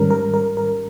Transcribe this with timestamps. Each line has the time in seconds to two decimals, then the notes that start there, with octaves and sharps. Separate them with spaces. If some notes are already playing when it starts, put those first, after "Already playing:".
Already playing: G#2 D#3 G3 C#4 A#4
0.10 A#4
0.34 A#4
0.57 A#4